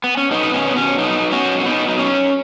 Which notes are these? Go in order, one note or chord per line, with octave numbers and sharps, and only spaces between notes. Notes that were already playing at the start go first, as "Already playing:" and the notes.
B3
C#4
B2 B3 D#4
B2 C#4
B3
B2 C#4
F#3 B3 D#4
F#3
C#4 F#4
B2
C#4
B2 B3 D#4
F#3 D#4
C#4
F#3